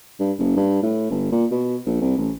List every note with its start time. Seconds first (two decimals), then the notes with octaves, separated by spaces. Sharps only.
0.20 G2
0.39 F#1
0.56 G2
0.83 A2
1.11 G1
1.32 A#2
1.51 B2
1.86 A#1
2.01 C2
2.17 A1